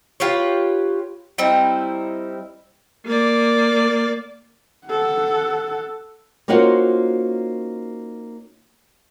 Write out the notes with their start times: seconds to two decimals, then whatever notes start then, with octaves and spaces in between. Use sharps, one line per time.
0.20 F4 G4 B4 C#5
1.38 G3 C4 D#4 E4
3.06 A#3 D5
4.86 A4 F#5
6.48 A#3 C#4 D#4 F4 F#4 C5